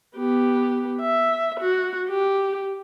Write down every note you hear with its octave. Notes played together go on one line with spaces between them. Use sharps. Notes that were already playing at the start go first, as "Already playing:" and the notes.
B3 G4
E5
F#4
G4